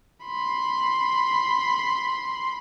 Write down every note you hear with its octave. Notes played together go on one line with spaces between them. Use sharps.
B5 C6